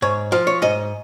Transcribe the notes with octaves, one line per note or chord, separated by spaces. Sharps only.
G#2 C#5
F3 F5
C#5
G#2 D#5